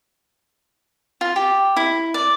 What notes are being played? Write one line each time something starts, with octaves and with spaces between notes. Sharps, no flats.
F4
G4
E4
D5